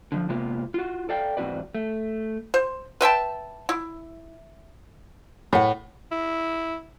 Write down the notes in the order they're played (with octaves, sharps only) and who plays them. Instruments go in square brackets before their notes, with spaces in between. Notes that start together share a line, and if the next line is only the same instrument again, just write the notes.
[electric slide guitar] D3 E3 F3
C3 G#3 A#3 B3 F4
F4 F#4
A4 D5 F5 G5
E2 G#2 C4 F#4 B4 D5
A3
[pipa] C5
B4 E5 G5 A5
E4
[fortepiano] A2 [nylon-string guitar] B4 F#5
[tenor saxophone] E4